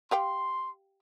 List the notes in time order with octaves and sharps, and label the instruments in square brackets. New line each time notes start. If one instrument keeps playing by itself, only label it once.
[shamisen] G4 F5 G5 [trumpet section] C6